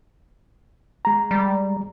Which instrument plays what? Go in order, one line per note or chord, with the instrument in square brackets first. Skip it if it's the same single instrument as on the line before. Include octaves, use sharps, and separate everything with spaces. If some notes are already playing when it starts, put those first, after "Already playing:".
[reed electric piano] G#3 A#5
[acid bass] G3